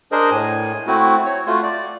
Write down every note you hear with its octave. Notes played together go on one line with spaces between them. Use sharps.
D4 G#4 A#4 C5 D#5
A2 G#5
A3 C4 E4 F#4
C#5
A3 F4 F#4
D5